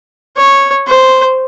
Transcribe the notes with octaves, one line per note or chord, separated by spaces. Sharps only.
C#5
C5